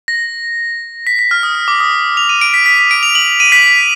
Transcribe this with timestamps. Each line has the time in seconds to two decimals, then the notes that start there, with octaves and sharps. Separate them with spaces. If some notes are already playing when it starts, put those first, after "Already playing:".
0.08 A#6
1.07 B6
1.19 B6
1.31 F6
1.43 D#6
1.55 D#6
1.68 D6
1.80 D#6
2.17 F7
2.29 D#7
2.41 D7
2.54 B6
2.66 B6
2.79 B6
2.91 D7
3.03 F7
3.15 F#7
3.40 D#7
3.52 B6